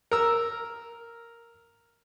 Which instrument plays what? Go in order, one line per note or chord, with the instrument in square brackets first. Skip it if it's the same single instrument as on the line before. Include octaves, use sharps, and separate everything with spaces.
[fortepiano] A#4 E6